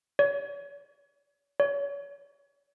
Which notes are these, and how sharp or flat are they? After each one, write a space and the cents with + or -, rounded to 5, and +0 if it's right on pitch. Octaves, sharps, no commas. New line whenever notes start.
C#5 +40
C#5 +35